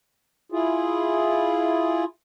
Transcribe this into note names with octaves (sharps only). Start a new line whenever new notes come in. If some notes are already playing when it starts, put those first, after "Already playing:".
E4 F4 G#4